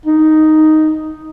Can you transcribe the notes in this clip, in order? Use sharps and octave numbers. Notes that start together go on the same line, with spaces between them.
D#4